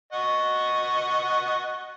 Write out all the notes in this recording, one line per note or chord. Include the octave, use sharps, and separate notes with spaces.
D#5 F#5 C#6